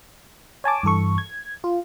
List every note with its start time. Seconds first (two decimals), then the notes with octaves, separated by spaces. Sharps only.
0.64 C#5 G#5 A5 D6
0.83 G2 E3 A4 C#6
1.18 G#6
1.64 F4